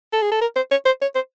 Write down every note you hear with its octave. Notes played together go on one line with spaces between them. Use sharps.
A4
G#4
A4
A#4
C5
C#5
C5
C#5
C5